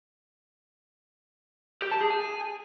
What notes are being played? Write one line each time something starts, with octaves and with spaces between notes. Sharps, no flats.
G4
A5
G#4
G#5